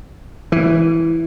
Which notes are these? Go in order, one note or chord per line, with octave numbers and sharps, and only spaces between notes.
E3